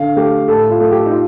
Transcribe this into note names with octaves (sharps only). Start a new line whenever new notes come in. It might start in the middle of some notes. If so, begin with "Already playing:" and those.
Already playing: D3 F5
A3 G4
A2 A4
F4
A3
G4
D#4
F4